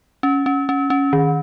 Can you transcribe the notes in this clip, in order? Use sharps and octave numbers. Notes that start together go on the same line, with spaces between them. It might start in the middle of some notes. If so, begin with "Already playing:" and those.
C#4
C#4
C#4
C#4
D#3